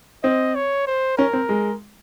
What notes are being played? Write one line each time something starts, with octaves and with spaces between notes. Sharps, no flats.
C4 D#5
C#5
C5
C#4 A#4
C4
G#3